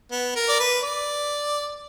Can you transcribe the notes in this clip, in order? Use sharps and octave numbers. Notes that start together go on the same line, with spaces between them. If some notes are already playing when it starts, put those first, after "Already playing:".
B3
A#4
D5
B4
D5